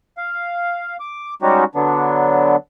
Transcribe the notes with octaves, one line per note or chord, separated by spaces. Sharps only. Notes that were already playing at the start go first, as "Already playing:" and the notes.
F5
D6
G3 G#3 C#4 D#4 F#4 G4
D3 F#3 B3 D4